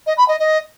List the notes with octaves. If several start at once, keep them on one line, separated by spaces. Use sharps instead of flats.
D#5
B5
D#5
D#5